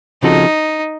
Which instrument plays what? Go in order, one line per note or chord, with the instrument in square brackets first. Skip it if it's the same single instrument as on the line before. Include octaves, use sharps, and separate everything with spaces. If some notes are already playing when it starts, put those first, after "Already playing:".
[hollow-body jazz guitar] C#3 F3 C4 F#4 A4 [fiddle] D#4